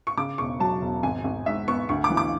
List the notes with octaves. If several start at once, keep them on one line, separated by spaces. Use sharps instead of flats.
C#6
C#3 D6
E1 C#6
F#3 A5
E1
G#1 G#5
G#1
G#2 E5
B3 C#6
D2 C#6
D6
E3
D6